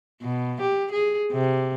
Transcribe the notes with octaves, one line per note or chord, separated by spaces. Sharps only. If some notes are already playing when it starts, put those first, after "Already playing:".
B2
G4
G#4
C3